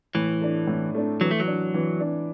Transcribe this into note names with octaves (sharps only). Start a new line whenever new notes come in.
A2 E3
A3 D4
A2
A3 D4
E3 F#3
A3
F#3
D4
E3
D4